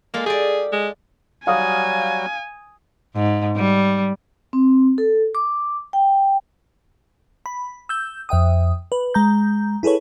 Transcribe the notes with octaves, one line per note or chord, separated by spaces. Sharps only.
G#3 A#3 F4 A4
G4 G#4 D5
G#3
F#3 G3 F#4 F5 G#5 D#6
G#2
G3
C4
A4
D6
G5
B5
E6 G6
F2 E5 G5 D#6
B4
G#3 A#5 G6
E4 G#4 A4 B4 C#5